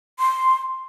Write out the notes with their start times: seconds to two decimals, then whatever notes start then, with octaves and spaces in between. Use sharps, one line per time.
0.19 C6